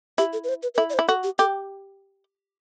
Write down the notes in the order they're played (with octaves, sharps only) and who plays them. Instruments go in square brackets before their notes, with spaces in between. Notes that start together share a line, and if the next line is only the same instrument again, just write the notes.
[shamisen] E4 [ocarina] G4
[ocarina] A4
B4
C5
B4
B4
[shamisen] E4 [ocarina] A4
[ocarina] D5
C5
[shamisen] E4
[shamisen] F#4 [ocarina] A4
[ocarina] G4
[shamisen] G4 [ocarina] A4